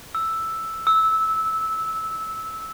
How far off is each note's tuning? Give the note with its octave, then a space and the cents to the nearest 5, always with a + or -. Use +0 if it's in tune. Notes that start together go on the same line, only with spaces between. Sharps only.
E6 +0
E6 -15